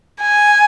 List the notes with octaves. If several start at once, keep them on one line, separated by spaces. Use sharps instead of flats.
G#5